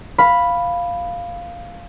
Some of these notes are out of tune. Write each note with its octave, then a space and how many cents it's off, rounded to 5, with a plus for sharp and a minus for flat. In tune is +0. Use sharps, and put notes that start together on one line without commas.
F5 +0 B5 +0